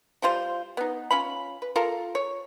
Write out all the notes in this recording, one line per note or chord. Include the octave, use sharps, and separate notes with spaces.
F3 G3 F4 C5
B3 D#4
C#4 F4 B5
B4
F4 A4 A#4
C#5